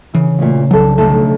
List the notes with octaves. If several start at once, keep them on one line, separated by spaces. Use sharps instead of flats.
C#3 E3
D2 A#2
F1 C2 F#3 D4 A4
B1 D3 A3 A4